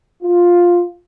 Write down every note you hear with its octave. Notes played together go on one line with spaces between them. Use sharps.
F4